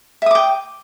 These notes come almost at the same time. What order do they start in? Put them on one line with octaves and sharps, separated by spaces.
E5 D#6 D6 G5